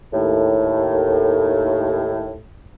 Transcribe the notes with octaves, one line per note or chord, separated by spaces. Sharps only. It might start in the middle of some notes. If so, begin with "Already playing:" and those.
D#2 A2